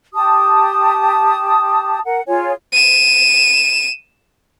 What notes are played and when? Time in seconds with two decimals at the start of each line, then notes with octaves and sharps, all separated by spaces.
0.14 G4 A5 D#6
2.05 A#4 F#5
2.28 F4 G#4 C#5 G#5
2.72 D#7 E7